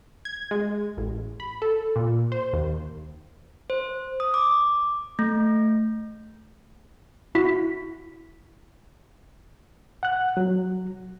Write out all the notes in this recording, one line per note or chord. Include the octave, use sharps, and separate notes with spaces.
G#6
G#3
A1
B5
A4
A#2
C5
D#2
C5
D#6
D6
A3
E4 F#4 B6
F#5 F#6
F#3